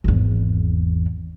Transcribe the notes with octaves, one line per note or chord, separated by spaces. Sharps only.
G#1 E2